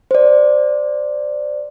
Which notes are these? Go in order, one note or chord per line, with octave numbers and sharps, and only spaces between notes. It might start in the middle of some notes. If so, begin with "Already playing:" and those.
C5 D5